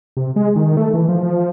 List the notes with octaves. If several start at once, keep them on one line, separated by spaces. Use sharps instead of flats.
C3
G#3
D#3
A3
E3
F3
F3